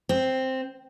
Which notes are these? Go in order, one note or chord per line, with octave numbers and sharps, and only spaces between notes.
C4